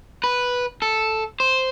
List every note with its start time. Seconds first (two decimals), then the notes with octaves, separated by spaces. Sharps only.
0.24 B4
0.82 A4
1.40 C5